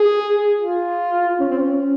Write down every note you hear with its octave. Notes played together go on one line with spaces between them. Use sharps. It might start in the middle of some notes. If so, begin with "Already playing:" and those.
Already playing: G#4
F4
C#4
C4
C#4